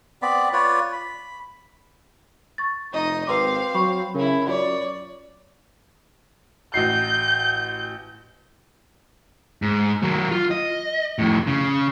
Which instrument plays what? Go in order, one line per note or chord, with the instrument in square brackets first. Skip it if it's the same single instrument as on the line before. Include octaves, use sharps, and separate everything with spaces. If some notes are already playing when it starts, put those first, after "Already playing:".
[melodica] B3 C4 D5 B5
F4 B4 C#5 D5
B5
[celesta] C#6 A6
[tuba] F1 [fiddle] D#4 D#5
[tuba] G#1 [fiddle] C4 F5 [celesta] B4 C6 D6
[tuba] F#3 [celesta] B5 C#6
[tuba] C#3 [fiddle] C#4 E4 [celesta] A#4
[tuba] F#2 [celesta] F4 [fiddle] C#5 D5
[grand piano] A1 F#4 C7 [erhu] G6
[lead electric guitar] G#2
D#3 F#3
F4
D#5
F2 A2
C#3